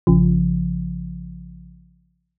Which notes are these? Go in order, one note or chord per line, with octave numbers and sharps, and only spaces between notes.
A#1 C#3 F3